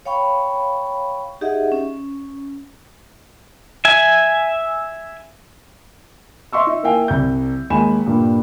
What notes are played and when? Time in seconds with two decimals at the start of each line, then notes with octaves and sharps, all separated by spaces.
0.05 C#5 F5 G5 B5 C#6
1.41 D#4 G4 G#4 D#5 E5 F#5
1.72 C#4
3.85 E5 G#5
6.53 D#5 E5 C6 C#6 E6
6.67 D#4
6.83 A#3 E4 F5 G5 G#5
7.08 C2 G6
7.70 D#2 G#3 G#5 B5 E7
8.06 G2 A#2 G3